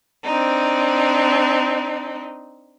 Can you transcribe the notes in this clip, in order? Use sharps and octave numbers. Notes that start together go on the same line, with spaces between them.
C4 D4 D#4